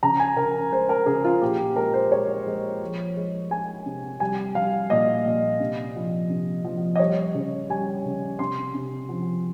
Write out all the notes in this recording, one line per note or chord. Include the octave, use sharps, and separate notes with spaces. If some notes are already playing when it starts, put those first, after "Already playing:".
C#3 A#5
G#5
C#3 A#4
G#3 C5
A#4
C#3 G#4
F4
A#2 G4
G4
G#3 A#4
C5
G#3 C#5
G#3
F3
G#3
G#3 G#5
C3
G3 G#5
G3 F5
A#2 D#5
A#2
C3
F3
C3
F3
D#5
G3 C#5
C#3
G3 G#5
C#3
C3 C6
C3
F3